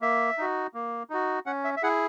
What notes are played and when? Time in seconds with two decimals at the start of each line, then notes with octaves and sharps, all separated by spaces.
0.01 A#3 E5
0.38 D#4 F#4
0.74 A#3
1.10 D#4 F#4
1.46 C#4 F#5
1.64 E5
1.77 E5
1.83 E4 G#4 F#5